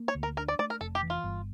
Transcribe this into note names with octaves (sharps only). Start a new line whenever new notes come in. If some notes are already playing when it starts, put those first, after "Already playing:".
Already playing: A#3
C#5
D2
A#4
D4 A#4
D5
A3 D5
A#4
F1 A4
G4
E3
F4
G1